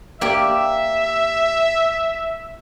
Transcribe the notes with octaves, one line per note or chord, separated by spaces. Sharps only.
A#3 G4 D5 E5